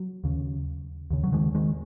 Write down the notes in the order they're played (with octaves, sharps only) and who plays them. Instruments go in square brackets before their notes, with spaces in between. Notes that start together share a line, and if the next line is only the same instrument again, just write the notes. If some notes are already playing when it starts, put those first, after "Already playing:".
Already playing: [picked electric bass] F#3
D#2 C#3
D#2 C#3
F#3
D#3 G#3
D#3 G#3